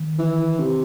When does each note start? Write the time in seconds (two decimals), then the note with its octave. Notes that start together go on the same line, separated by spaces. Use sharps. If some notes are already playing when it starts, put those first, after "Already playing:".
Already playing: D#3
0.19 E3
0.59 C3